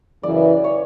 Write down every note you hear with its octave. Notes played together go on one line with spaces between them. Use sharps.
F#2 C#3 E3 D5
C#5